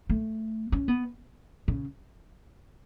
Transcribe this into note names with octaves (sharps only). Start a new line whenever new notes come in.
A3
C#4
B3
C#3